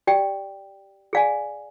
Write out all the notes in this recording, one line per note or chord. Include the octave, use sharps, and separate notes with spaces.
G4 D5 G5
G#4 D5 F5 G#5